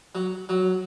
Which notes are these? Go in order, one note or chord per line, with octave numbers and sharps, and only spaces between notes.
F#3
F#3